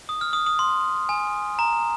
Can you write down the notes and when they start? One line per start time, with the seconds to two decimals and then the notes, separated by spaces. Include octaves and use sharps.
0.09 D#6
0.21 F6
0.33 D#6
0.46 D#6
0.59 C6
1.09 G#5
1.59 A#5